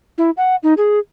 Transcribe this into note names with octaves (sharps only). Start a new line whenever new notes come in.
E4
F#5
D#4
G#4